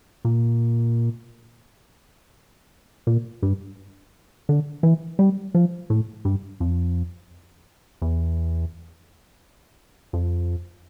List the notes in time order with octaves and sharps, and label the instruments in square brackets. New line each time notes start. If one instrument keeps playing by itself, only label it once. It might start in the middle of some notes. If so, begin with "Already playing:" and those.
[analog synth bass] A#2
A#2
G2
D3
E3
G3
F3
A2
G2
F2
E2
F2